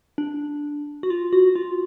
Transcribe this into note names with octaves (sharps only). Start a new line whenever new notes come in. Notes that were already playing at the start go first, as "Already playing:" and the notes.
D4
F#4
F4
F#4
F4